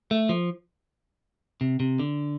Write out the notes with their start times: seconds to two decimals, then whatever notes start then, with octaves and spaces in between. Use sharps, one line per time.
0.11 A3
0.29 F3
1.61 C3
1.80 C3
1.99 D3